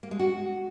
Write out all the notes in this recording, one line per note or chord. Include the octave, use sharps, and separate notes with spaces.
A#3
G#3
F#4